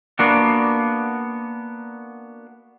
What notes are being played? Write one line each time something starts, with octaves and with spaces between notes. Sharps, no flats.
A#3 B3 D4 F#4